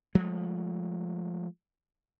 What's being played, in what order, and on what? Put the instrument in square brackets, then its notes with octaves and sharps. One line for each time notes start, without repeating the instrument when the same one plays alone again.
[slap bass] F3 G#3 A3